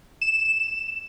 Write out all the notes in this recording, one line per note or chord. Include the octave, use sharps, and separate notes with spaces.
E7